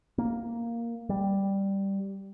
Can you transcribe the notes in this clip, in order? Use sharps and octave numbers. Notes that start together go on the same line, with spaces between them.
A#3
G3